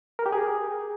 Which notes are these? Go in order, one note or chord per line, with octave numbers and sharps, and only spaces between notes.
A#4
G4
G#4